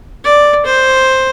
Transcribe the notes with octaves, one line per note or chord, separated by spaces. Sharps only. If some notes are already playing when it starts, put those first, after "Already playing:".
D5
C5